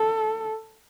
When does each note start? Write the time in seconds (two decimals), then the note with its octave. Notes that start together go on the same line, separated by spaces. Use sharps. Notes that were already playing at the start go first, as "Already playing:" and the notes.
Already playing: A4